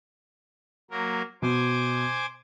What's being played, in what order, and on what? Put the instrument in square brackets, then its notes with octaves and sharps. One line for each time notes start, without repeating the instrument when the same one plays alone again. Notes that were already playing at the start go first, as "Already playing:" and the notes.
[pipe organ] F#3 A#3 A#4
[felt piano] B2 [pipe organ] C5 G#5 D6